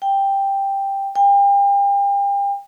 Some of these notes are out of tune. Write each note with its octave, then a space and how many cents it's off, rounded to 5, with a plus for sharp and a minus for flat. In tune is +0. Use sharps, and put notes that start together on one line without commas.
G5 +5
G5 +35